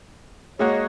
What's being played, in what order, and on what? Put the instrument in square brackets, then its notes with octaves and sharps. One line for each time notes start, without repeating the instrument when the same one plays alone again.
[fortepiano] G#3 A#3 F#4 [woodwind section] C#5 D#5